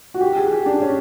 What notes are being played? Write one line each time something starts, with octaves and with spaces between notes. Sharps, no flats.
F#4
G4
G#4
G4
D4
C#4